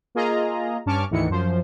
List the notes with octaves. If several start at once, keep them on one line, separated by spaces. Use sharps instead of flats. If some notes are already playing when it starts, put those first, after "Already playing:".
A#3 F4 G#4 D#5 A#5
G2 C#4 A5 C#6 D6 F6
D2 G#2 D#3 E3 C#7
F#2 F3 C5